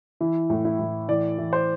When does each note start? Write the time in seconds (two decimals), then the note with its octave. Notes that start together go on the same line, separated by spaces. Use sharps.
0.21 E3 E4
0.50 A2
0.65 E4
0.79 A2
1.09 E3 D5
1.38 E3
1.53 C5